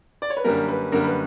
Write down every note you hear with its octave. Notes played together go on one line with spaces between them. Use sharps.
D5
C#5
B4
F#2 D3 G3 A#3 A#4
B4
F#2 D3 G3 A#3 A#4
B4